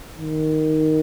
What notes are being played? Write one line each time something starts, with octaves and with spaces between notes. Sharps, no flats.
D#3